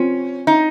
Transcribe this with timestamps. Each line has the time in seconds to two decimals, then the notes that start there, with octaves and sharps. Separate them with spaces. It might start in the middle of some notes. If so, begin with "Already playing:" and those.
Already playing: C4 C#4 F4 C5
0.47 D#4